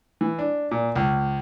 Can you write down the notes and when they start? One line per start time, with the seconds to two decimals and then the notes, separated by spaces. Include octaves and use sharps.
0.21 E3
0.39 D4
0.71 A#2
0.96 C#2